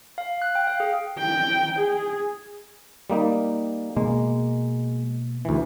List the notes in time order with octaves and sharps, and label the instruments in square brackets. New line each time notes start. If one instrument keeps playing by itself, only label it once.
[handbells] F5
F#6
G5
F5
G#4
[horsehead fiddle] G5
G#4
[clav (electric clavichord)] G3 A#3 D#4
[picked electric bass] B2 A#3 [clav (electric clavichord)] G#3
[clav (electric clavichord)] D2 E3